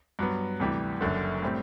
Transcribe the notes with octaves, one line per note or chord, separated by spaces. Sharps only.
G2 F#3 B3
D2 C3 E3 G3
F#1 F#2 D3
A2 G3 C4